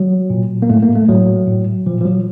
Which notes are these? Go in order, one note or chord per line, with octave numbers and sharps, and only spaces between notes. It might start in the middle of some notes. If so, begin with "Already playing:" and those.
Already playing: F#3
A#2
A#3
A2 A3
A#3
A3
A2 F#3
A2
A#2 F3
F3
F#3